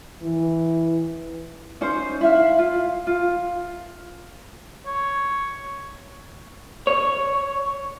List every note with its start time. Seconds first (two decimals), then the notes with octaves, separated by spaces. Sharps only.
0.22 E3
1.81 C#4 D#4 C5
2.21 E4 E5 F5
2.59 F4
3.07 F4
4.86 C#5
6.87 C#5